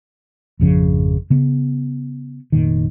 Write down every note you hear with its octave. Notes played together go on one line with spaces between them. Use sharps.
G#1 F2 C#3 F3
C#3 B3
F1 A#2 D#3